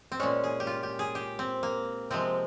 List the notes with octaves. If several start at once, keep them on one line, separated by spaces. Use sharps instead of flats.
C4
A#2 G#3 C#4
G#4
G4
F4
G4
G#4
G4
C4
A#3
C3 F3 G#3 C4